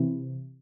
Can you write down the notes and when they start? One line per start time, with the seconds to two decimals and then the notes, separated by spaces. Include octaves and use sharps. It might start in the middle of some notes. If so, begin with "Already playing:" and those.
Already playing: C3 E3